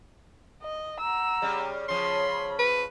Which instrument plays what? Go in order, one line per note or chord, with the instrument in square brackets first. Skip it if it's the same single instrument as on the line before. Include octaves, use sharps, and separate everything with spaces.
[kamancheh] D#5
[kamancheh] F#5 E6 [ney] A#5
[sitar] C#3 G3
[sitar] C#3 F3 [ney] C#5 [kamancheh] B5 [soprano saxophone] C6
[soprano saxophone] B4